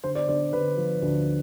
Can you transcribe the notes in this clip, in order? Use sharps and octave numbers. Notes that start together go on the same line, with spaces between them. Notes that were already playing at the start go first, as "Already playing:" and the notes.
D3 C5
D5
D3 D5
D3 B4
F3
D2